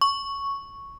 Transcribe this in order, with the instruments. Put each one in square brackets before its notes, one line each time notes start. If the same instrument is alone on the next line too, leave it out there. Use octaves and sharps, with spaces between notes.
[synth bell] C#6